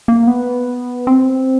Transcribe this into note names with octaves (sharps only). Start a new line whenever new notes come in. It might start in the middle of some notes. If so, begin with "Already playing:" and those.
A#3
B3
C4